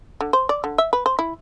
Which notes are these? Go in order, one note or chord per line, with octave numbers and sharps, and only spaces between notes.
D3
C5
D5
D3
E5
B4
C5
E4